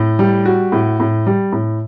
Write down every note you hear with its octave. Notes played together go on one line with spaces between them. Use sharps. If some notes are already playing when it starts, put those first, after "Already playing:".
Already playing: A2
G3
F#4
A2
A2
G3
A2